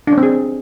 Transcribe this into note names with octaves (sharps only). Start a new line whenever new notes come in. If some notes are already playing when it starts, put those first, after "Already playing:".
D4
C#4
C4
G#4